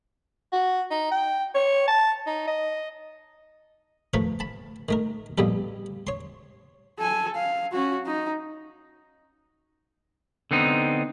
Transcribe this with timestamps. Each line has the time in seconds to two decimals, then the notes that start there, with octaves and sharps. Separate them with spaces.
0.52 F#4
0.91 D#4
1.12 G5
1.55 C#5
1.88 A5
2.27 D#4
2.47 D#5
4.14 F3 A3 A#4 B4 B5 C#6
4.40 A5 B5
4.89 D#3 A3 A#4
5.38 A#1 G2 B2 G3 A4
6.07 C#5 C6
6.98 A4 G#5
7.35 F5
7.72 C#4 F#4
8.06 D#4
10.51 D3 B3 C4 D#4